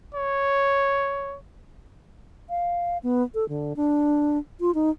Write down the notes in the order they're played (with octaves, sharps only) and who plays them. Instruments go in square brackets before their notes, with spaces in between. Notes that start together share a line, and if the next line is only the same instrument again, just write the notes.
[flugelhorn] C#5
[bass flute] F5
B3
A4
D3
D4
F4
D#4